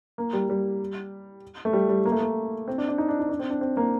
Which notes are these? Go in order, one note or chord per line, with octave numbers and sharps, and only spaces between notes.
A#3
G3
G3
A3
G3
G3
A#3
A3
A#3
C4
D4
D4
D#4
D4
D#4
D4
C4
D4
C4
A#3